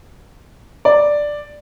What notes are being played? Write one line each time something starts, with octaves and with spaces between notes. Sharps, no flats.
D5